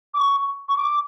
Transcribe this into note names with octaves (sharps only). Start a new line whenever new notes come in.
D6
C#6
C#6
D6